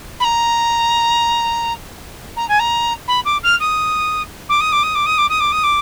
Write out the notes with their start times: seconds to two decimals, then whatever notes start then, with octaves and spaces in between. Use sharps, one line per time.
0.20 B5
0.24 A#5
2.37 A#5
2.49 G#5
2.60 A#5
3.08 B5
3.25 D6
3.43 F6
3.60 D#6
4.49 D6
4.61 D#6
4.72 D6
4.83 D#6
4.95 D6
5.06 D#6
5.18 D6
5.29 D#6
5.40 D6
5.52 D#6
5.63 D6